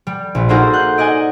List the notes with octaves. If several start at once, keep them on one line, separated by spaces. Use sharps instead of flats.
G3
A#1
A#3 D#4 F#4 G#4 A4 C5
F#6 G6
D5 D#5 F#5 G#5